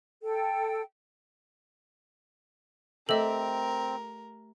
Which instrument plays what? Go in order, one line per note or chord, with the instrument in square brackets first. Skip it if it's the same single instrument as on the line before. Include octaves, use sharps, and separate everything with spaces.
[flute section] A4 G5
[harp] A3 G4 E5 [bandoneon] C4 [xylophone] A4 D#5 [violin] A#4